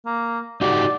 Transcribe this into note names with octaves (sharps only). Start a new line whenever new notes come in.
A#3
D#4 F#4 G4 D5